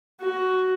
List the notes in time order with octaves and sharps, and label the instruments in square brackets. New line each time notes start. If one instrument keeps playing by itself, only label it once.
[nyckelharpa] F#4